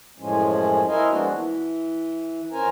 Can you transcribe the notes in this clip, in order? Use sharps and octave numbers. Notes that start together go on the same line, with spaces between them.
F#2 A2 F3 G#3 C#4
E4 A#4 C5 D#5 F5 G#5
F3 G#3 A#3 B3 D4 F#4
E3
F2 C#4 A#4 C5 G#5 A#5